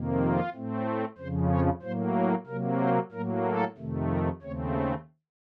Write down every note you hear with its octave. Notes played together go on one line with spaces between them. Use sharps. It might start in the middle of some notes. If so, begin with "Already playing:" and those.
Already playing: F2 C3 D#3 A#3
F4
A2 A3 C4
F2 C#3 F3 C5
C#5
A2 F#3 A#3 C5
A#4
C3 F#3 A#3 A#4
C5
A2 F#3 A#3 A#4
A4
F2 C3 D#3 A3
A#4
D#2 C#3 A3 C4 C#5